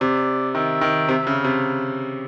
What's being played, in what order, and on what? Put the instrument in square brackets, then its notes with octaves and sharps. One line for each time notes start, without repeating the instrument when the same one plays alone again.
[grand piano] C3 [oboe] D5
[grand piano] D#3 [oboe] E5
[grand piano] D#3
C3
C#3
C3